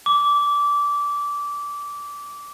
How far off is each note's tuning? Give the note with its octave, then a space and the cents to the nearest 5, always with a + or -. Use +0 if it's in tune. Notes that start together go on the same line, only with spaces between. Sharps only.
D6 -20